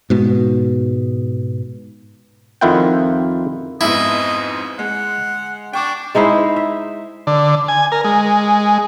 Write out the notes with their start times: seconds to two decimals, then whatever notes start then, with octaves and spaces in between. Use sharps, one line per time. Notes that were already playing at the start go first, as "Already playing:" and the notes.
0.10 G#2 B2
2.61 F2 D#3 E4 F4 F#5 G5
3.81 F2 G#2 B3 E4 D#5
4.79 G#3 F#5
5.73 D4 G5 C#6 D6
6.15 G#3 D#4 E4 C5
6.56 E5
7.27 D3
7.68 G#5
7.92 A#4
8.04 G#3